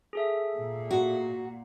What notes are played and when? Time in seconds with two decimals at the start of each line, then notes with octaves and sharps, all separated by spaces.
0.13 G#4 A4 E5
0.57 A#2
0.91 F#4